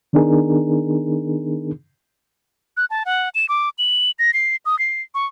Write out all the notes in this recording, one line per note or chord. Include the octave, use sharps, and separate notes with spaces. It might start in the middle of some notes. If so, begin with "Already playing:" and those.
D#3 B3 D4 D#4 G#4 A#4
F#6
A5
F#5
E7
D6
F#7
A#6
C7
D#6
C7
C#6